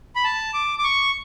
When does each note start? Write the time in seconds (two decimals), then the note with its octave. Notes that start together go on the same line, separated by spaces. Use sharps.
0.16 B5
0.24 A5
0.54 D6
0.79 D6
0.84 C#6